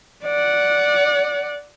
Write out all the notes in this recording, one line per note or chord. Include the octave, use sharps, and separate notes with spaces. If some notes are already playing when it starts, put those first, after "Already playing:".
D5 F#5